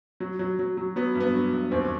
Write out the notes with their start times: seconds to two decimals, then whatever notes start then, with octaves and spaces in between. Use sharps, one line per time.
0.20 F#3
0.39 F#3
0.59 F#3
0.77 F#3
0.96 F#3 B3
1.15 G2
1.20 B3
1.34 F#3
1.53 G2
1.71 D#2 C4